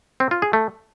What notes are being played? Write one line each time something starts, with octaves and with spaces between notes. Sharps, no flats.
C4
F4
G#4
A3